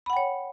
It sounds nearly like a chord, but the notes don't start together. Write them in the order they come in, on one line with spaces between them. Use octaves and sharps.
B5 F#5 G5 C#5